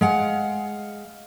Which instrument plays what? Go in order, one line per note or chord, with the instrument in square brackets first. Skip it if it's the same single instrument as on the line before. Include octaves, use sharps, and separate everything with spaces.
[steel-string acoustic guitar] G#3 F5 F#5